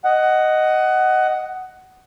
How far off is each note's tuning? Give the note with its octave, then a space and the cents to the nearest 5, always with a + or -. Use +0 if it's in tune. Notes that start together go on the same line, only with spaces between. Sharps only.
D#5 +0 F#5 +15